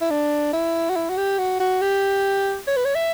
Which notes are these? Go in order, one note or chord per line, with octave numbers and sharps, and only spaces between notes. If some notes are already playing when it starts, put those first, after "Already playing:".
E4
D4
E4
F#4
E4
F#4
G4
F#4
F#4
G4
C#5
B4
C#5
E5